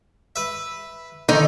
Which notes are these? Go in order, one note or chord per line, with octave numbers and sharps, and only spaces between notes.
B4 E5
D3 D#3 D#4